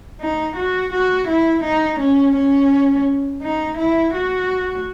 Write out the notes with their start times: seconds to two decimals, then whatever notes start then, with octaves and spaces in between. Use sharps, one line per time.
0.21 D#4
0.57 F#4
0.93 F#4
1.28 E4
1.64 D#4
1.99 C#4
2.36 C#4
3.42 D#4
3.78 E4
4.14 F#4